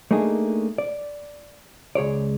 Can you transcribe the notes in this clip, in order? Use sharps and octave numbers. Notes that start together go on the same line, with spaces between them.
A3 A#3 D4 D#4 G#4
D5
C#2 G#4 C#5 D5